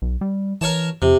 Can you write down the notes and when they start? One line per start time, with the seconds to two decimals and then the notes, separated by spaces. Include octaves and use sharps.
0.02 B1
0.21 G3
0.61 E3 A#4 C#5 A5
1.02 F2 C3